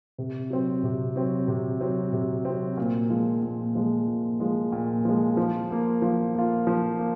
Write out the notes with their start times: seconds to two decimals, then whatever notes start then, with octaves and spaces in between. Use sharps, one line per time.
0.18 C3
0.50 F#3 C4
0.83 C3
1.16 F#3 C4
1.48 C3
1.81 F#3 C4
2.13 C3
2.45 F#3 C4
2.77 A#2
3.10 F3 G#3
3.43 A#2
3.75 F3 G#3
4.08 A#2
4.40 F3 G#3
4.72 A#2
5.05 F3 G#3
5.37 F3
5.70 A#3 F4
6.02 F3
6.35 A#3 F4
6.67 F3
6.99 A#3